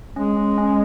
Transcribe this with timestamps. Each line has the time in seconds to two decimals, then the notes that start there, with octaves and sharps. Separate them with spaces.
0.16 G#3 C#4
0.37 C#4
0.58 C#4